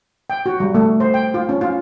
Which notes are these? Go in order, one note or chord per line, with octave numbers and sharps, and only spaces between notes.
G5
F#4
G3
A3
C5
G5
F4
C#4
F4